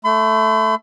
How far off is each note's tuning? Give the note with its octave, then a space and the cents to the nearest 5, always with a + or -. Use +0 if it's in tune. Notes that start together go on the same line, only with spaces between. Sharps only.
A3 +0 B5 +45